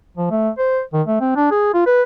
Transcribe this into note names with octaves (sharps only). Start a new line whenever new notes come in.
F3
A3
C5
D#3
A3
C4
D4
G#4
F4
B4